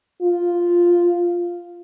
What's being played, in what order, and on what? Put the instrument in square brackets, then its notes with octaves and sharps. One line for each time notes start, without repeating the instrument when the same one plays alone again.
[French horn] F4